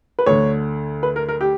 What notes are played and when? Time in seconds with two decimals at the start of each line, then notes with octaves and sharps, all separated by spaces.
0.19 B4
0.26 D2 D3 C#5
1.03 B4
1.16 A#4
1.29 A#4
1.41 G4